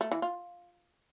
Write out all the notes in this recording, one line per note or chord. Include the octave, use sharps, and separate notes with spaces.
A3
E3
F4